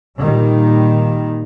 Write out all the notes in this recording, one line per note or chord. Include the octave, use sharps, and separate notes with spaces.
A#2 D#3 G3